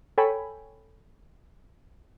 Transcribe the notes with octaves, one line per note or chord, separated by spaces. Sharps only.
A4 C#5 G5 G#5 B5